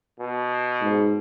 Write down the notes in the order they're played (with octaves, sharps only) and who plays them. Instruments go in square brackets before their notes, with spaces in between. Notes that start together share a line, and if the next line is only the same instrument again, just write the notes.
[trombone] B2
[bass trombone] G#2